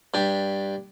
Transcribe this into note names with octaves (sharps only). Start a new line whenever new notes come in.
G2 D4 G4